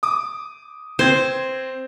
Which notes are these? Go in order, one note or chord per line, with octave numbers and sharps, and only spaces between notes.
D6 D#6
C4 C5 G#6